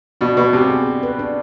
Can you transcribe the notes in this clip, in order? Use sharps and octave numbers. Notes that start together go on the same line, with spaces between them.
B2 D4
B2 B4
C3 B3
G#4
D4
B4
D4